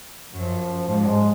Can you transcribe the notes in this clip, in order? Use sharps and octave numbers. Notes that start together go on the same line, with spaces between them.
F#2 F3
G#2 F3
G#3